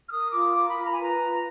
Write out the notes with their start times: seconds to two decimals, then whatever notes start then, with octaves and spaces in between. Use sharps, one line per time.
0.07 F6
0.12 A#4 D#6
0.33 F4 D6
0.56 A#4 D6
0.70 B5
0.78 F4
0.85 A#5
0.94 G#5
1.00 B4 A#5
1.21 F4